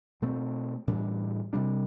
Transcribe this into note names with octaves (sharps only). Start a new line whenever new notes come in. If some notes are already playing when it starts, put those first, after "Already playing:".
B2 A3 C4
A2 E3 G3 D4
C3 G3 D4